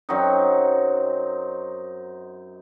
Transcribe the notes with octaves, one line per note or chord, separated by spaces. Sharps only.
F#2 F#3 C4 D#4